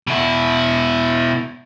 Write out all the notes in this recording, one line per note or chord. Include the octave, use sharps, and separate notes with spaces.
B2 E4